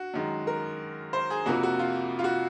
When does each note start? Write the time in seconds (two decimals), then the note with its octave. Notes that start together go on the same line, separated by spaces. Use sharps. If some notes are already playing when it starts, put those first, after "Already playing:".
Already playing: F#4
0.14 F#2 D#3 G#3
0.47 A#4
1.13 C5
1.30 G#4
1.46 F2 C3 F3 A#3 F#4
1.63 F#4
1.79 F4
2.19 F4
2.24 F#4